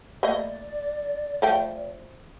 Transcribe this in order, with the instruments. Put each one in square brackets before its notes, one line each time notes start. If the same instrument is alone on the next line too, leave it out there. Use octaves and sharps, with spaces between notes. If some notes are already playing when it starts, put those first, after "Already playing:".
[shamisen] A3 A#3 D#5 [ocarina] D5
[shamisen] F3 A3 G5